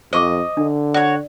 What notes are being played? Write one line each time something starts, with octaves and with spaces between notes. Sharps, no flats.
F2 C5 D#5 C#6 D6
D3 D4
F#4 C#5 D5